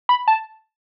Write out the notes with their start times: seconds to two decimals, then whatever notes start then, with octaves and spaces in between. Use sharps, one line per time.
0.09 B5
0.28 A5